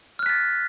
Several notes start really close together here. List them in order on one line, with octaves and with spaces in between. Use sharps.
F6 F#6 B6 A6